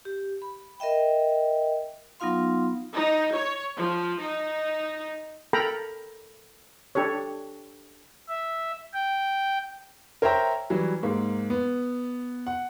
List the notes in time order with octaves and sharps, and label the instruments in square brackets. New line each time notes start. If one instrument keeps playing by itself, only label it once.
[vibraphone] G4
B5
A#4 D#5 E5 G5
F#3 B3 D#4 F4 F5 C6
[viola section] D#4
C#5
F3
D#4
[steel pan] A4 A#4 G5 A#5 B5
D4 G4 A4 C#5
[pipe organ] E5
G5
[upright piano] A#4 C5 C#5 E5 G5 A#5
E3 F#3 G3
G#2 A#3
B3
F#5